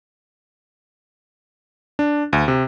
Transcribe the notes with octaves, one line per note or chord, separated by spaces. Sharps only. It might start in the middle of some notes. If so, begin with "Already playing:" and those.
D4
D2
C3